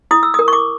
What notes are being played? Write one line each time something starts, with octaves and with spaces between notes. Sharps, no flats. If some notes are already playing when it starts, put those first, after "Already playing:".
E4 D#6
E6
A#4 D#6
C#6
D6